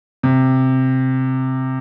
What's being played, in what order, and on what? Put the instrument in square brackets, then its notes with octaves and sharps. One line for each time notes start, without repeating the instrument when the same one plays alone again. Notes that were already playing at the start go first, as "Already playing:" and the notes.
[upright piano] C3